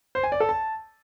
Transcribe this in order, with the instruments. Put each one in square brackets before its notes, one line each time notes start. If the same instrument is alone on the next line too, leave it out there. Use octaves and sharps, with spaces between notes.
[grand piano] C5
G#5
D5
A4
A5